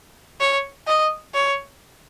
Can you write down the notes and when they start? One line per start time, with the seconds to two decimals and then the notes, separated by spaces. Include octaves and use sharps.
0.40 C#5
0.87 D#5
1.34 C#5